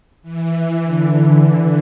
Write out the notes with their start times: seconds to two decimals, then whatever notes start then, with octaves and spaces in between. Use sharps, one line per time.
0.22 E3
0.83 D3